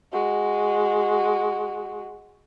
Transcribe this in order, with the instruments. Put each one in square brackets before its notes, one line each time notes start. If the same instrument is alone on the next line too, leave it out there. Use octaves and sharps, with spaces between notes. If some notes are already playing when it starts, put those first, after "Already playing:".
[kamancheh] G#3 F#4